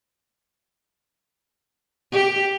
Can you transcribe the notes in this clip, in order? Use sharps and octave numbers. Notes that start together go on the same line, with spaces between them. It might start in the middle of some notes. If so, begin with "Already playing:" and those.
G4